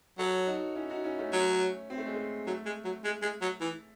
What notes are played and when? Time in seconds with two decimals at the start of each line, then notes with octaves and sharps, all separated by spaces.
0.18 F#3 A4 C#5
0.47 D#4 F#4
0.76 C#4 E4
0.90 D#4 F#4
1.04 C#4 E4
1.19 A3 C#4
1.33 F#3
1.90 C4
1.98 A3
2.05 G#3
2.14 A3
2.47 F#3 A3
2.65 G#3
2.84 F#3
3.04 G#3
3.22 G#3
3.42 F#3
3.60 E3